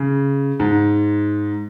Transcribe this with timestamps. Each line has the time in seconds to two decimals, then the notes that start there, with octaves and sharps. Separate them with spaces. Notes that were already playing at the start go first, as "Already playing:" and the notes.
Already playing: C#3
0.60 G#2